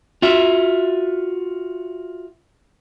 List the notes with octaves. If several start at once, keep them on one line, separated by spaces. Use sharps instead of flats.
F4 F#4 E5